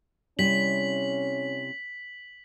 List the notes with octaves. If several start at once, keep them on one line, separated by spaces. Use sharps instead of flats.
C3 G3 C#4 E4 B6 F#7